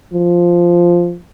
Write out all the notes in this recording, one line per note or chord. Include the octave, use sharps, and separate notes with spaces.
F3